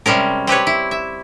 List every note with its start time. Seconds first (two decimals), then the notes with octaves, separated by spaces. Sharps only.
0.06 C3 G3 G#3 C#4 A#4
0.47 C4 G4 B4 C#5
0.67 E4
0.91 E5